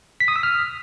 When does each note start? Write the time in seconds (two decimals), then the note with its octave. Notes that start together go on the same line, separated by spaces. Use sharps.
0.20 B6
0.28 D#6
0.36 E6
0.43 F6